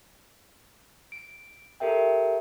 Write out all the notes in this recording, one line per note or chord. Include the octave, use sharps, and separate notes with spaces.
D7
G4 A4 A#4 E5 G5